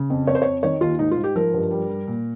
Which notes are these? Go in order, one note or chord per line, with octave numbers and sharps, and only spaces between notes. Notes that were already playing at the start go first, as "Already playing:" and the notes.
Already playing: C#3
F2
F2 C#5
C5
F2 C#5
D#3 C#5
D#2 F4
G#2 D#4
F4
G#2
G4
F3 A#4
G2
G3
G3
A#2